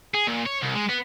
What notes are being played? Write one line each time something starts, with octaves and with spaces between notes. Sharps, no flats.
G#4
A#2
C#5
C2
G#3
B3